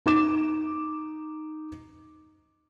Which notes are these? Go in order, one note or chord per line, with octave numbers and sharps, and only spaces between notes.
D#4 D6 E7